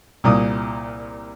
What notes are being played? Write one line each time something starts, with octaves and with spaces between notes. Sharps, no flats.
C2 A#2 D#6